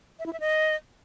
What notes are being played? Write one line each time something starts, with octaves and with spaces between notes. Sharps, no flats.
E5
E4
E5
D#5